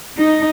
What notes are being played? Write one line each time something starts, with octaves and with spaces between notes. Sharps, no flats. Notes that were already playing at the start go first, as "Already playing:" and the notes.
D#4